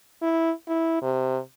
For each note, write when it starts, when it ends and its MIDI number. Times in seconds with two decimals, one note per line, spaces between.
0.22 0.51 64
0.68 0.99 64
1.02 1.38 48